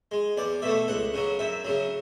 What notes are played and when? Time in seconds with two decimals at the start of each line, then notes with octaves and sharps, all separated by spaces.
0.11 G#3
0.37 E2 D5
0.62 B2 A3 E5
0.88 C#2 F#5
1.14 C#3 F#3
1.39 F#2 E5
1.65 C#3 F#3